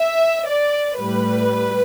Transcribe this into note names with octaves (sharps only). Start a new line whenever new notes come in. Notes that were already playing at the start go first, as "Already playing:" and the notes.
Already playing: E5
D5
A2 G3 B4